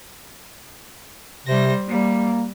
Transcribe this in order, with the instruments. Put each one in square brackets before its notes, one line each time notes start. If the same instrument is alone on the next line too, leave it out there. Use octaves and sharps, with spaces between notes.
[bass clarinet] C3 [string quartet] G3 C5 A#6
[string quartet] G3 [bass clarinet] A#3